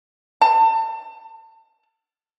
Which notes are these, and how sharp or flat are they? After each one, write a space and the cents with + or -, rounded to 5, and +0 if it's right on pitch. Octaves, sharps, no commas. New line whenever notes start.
A5 +30